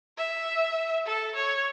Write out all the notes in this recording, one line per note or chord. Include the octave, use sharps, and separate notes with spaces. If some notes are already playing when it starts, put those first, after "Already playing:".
E5
A4
C#5